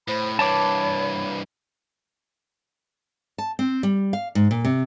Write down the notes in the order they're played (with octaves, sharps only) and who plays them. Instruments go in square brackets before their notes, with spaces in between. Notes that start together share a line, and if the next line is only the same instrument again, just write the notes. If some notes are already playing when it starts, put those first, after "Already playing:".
[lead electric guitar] A2 [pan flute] C5 [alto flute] B5
[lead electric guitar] G2 E3 [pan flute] C#5 [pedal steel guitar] A5 D6
[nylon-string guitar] A5
C4
G3
F5
G#2
A#2
C3